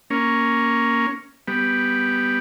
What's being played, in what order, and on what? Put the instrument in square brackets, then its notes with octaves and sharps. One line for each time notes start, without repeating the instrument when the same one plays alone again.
[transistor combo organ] A#3 C#4
G3 B3